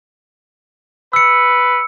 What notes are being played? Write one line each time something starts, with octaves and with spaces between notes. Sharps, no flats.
B4 E6 C#7